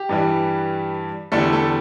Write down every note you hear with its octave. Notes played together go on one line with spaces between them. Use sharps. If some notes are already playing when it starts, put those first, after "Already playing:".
Already playing: G4
G2 E3 G3
E2 D3 G3 A3 A4
A3 A4